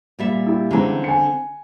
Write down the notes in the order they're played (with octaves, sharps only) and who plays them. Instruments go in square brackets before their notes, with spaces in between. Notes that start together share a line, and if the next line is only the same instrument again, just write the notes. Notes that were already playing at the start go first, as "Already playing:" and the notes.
[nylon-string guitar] A#2 G3 E5
[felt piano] E4 G4
[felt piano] C#2 E3 A#5 [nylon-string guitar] D3 C4
[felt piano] G#5 C#7